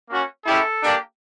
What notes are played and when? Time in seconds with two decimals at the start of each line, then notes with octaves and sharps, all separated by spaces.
0.09 A#3 C#4 F#4
0.45 G#3 C#4 E4 G4 A4
0.82 A#3 D4 G4